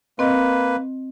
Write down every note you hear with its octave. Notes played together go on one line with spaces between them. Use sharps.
A#3 C4 B4 D#5